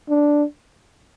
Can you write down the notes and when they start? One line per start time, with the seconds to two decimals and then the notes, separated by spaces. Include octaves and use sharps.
0.09 D4